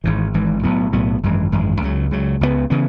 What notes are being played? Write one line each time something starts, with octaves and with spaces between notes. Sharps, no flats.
G#1 G#2 E3
G#1 G#2 E3
B1 A2 F#3 B3
B1 A2 F#3 B3
G#1 F#2 E3 G#3
G#1 F#2 E3 G#3
C#2 C#3 F#3
C#2 C#3 F#3
C#2 C#3 E3 B3
C#3 E3 B3